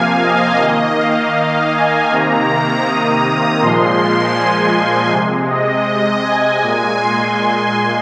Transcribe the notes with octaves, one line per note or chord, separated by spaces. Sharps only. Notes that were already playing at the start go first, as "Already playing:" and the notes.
Already playing: C3 F3 A#3 F5 G#5
D#5
D#3 A#3
F5
G#5
C3 D#3 A#3 A#5
D#6
A#2 F3 G#3 C6
G#5
C3 G#3
D#5
G#5
A#2 G#3
C6